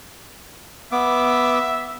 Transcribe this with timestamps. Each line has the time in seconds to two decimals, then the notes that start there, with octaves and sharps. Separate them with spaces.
0.92 B3 E5 D6